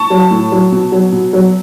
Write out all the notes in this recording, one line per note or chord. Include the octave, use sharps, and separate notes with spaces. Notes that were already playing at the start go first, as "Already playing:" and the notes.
Already playing: A5 C#6
F#3
A2
F#3
B2
F#3
B2
F#3